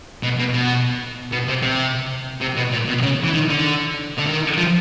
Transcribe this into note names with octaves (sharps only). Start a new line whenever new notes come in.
B2
B2
B2
B2
C3
C3
C3
B2
A#2
B2
C#3
E3
D#3
D3
D3
D#3
F3